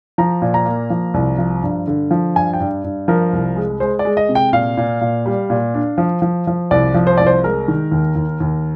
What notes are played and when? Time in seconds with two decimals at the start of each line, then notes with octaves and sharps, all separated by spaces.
0.18 F3 A#5
0.42 A#2
0.54 A#5
0.66 A#3
0.90 F3
1.14 C2
1.38 F3
1.63 G2
1.87 D3
2.11 F3
2.35 G2 G#5
2.53 G5
2.60 G2
2.84 G2
3.08 F3 A#4
3.33 C2
3.56 G#3
3.80 G#3 C5
3.99 D5
4.05 G#3
4.17 D#5
4.29 C3
4.35 G5
4.53 A#2 F5
4.77 A#2
5.01 A#2
5.26 G3
5.50 A#2
5.74 D4
5.98 F3
6.22 F3
6.47 F3
6.71 C2 D5
6.94 F3
7.07 C5
7.18 C2 D5
7.27 C5
7.44 G#3 A#4
7.68 D#3
7.92 D#2
8.15 D#2
8.40 D#2